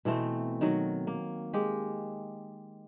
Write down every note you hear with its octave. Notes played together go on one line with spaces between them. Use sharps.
B2 E3 A3 C4
D#3 F#3 F#5
A#3
G#3 G4